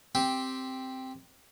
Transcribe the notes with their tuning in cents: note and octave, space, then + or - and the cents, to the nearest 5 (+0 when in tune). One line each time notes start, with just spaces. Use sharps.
C4 +0 G4 +0